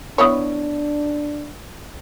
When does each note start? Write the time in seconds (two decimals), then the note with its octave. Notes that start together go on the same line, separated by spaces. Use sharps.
0.18 B3 D4 E4 C#5